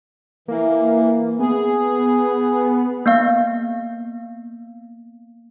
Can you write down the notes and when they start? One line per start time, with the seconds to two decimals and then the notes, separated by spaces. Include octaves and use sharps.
0.48 E3 A#3
1.40 B3 G#4
3.06 A#3 B3 F5